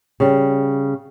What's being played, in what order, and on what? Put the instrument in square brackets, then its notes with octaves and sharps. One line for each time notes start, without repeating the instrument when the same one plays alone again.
[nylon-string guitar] C#3 G3